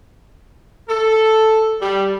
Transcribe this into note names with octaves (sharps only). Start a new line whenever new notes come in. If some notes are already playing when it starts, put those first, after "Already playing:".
A4
G3